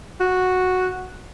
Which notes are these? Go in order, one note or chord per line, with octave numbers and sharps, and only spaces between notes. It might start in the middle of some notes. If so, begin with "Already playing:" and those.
F#4